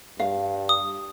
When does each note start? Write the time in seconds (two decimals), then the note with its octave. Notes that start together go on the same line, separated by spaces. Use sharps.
0.20 G2 F5
0.69 D#6